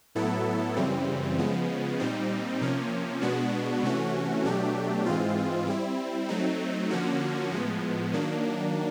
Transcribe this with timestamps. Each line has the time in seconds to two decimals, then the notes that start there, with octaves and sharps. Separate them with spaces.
0.15 A2 F#3 B3 E4 A4
0.76 F#2 C#3 E3 G3 C4
1.38 C#3 F3 G#3 B3
2.00 A#2 G3 C4 D#4
2.61 C3 F3 A#3 C#4
3.21 B2 G#3 B3 D4 F#4
3.83 C3 E3 A3 C#4 F#4
4.44 B2 F#3 A3 D4 G4
5.06 G#2 E3 G#3 C4 F4
5.67 G3 C4 E4
6.28 F#3 A3 C4 D#4
6.91 D3 F3 A#3 C#4 F#4
7.51 A2 F3 G#3 B3
8.13 D#3 F#3 A#3 D4